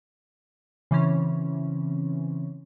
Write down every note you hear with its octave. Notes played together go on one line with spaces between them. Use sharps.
C#3 E3 C4 C#4